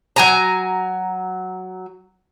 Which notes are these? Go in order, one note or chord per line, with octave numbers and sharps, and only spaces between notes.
F#3 G#5 A#5